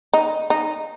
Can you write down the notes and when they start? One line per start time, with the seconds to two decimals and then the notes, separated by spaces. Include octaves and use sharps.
0.13 D#4
0.50 D#4